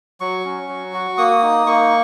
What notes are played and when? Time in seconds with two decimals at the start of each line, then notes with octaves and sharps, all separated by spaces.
0.20 F#3 C#6
0.45 C#4
0.68 F#3
0.93 F#4
1.18 A#3 D#6
1.43 D#4
1.67 A#3 C#6